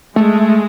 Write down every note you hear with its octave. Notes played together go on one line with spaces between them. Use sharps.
G#3 A3